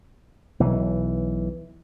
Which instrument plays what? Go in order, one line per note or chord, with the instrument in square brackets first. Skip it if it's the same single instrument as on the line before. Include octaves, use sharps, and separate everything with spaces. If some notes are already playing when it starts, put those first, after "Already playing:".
[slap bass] B1 E3